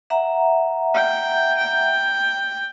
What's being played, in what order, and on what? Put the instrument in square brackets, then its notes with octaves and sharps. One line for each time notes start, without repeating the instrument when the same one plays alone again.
[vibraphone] E5 F#5 A#5
[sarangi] G5
G5